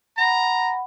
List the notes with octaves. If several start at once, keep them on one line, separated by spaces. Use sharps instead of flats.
F#5 A#5 B5